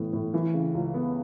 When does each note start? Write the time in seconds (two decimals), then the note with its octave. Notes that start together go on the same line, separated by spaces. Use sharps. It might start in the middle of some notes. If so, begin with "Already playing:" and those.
Already playing: A2 E3 B3
0.13 A2
0.34 E3
0.54 C#3
0.74 C#2
0.94 B3